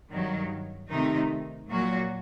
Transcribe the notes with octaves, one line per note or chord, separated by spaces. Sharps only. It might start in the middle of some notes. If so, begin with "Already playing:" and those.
G2 D#3 F#3
C3 D#3 A3 D#4
A#2 F#3 A#3 F#4